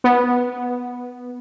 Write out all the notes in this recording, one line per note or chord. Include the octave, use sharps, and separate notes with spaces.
B3